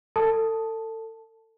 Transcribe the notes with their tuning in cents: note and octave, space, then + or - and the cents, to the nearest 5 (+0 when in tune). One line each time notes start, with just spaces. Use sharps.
A4 +30 A5 +0